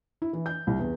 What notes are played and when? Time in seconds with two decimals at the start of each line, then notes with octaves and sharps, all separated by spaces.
0.22 E4
0.33 E3
0.46 G6
0.67 C2
0.80 E2